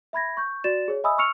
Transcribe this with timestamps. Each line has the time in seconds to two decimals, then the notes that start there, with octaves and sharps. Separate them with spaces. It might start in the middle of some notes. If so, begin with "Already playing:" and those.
0.13 E5 B5 G#6 A#6
0.37 C#6 G6
0.64 F#4 D5 A6 E7
0.88 G#4 C#5
1.04 D#5 E5 G#5 B5 D#6 E6
1.18 C#6 E6 F6 C#7 F7